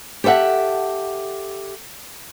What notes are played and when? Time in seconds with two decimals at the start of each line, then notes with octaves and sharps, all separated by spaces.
0.24 G4 A4 C5 E5 F#5